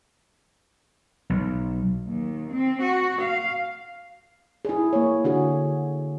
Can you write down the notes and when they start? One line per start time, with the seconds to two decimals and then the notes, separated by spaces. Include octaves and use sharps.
1.30 B1
2.07 D#2
2.52 C4
2.82 F#4
3.22 F5
4.65 E4 G#4
4.93 A#3 C#5
5.24 D3 F#4 G#4